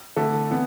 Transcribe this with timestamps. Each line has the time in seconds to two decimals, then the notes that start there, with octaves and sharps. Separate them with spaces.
0.16 D3 A3 E4 A4
0.50 E3 B3